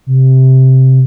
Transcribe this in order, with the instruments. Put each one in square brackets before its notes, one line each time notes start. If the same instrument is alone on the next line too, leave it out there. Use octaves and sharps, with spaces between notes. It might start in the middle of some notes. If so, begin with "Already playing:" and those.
[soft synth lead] C3